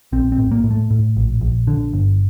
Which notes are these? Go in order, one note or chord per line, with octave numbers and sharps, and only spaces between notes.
A#1 C4
C4
A2
A#3
A2
A3
A2
A#1
A#1
D3
G1